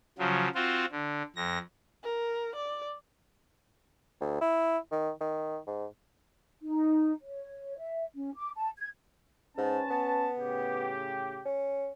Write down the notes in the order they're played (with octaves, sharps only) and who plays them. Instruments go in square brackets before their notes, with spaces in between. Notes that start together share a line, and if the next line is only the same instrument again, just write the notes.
[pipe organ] C#3 F3 F#3
C4 F4 F#4
D3
F2 A#6
[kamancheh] A#4
D5
[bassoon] D2
E4
D#3
D#3
G#2
[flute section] D#4
C#5
E5
C#4
D6
A5
G#6
[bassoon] G#2 [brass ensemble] C#4 B4 A5
[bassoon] B3
[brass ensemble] A2 C#3 G4
[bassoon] C#4